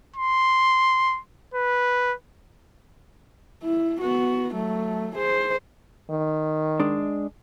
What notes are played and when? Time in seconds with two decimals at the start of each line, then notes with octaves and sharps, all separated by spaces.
0.16 C6
1.54 B4
3.63 E4
4.01 B3 F#4
4.55 F#3 A3
5.16 G#4 C5
6.11 D#3
6.80 G#3 D4